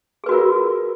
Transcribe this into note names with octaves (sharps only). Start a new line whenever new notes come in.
F4 F#4 G#4 A#4 B4